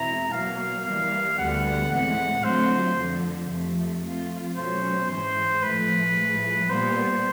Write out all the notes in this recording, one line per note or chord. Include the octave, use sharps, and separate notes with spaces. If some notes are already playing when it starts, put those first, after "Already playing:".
Already playing: E2 B2 G#3 C4 E4 A#5
B2 F#3 A#3 F5
E3 G3 A#3 F5
D2 D3 G3 B3 F#5
A2 E3 G#3 C4 F#5
D3 F#3 A3 C4 F4 C5
F2 D3 F3
F2 C3 F3 A3
F3 A3 C4 F4
B2 F#3 A3 C#4 C5
G#2 E3 G#3 C5
A2 F3 A3 B4
A2 F3 G#3
A#2 G3 B3 C5